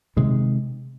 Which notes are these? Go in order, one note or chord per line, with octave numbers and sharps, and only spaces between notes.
C3 D#3 G#3